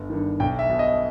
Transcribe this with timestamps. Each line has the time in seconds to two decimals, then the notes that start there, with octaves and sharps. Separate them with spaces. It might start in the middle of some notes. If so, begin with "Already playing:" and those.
Already playing: G1
0.10 G2 D#3
0.40 B1 G5
0.59 E5
0.69 B2
0.79 D#5